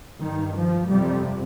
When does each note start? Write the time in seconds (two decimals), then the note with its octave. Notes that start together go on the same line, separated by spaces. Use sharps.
0.21 G2 D#3
0.55 F3
0.88 F2 C3 G3